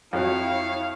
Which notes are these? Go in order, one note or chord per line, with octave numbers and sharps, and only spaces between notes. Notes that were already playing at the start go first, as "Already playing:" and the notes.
F2 F#3 E4 C#5 F5 G5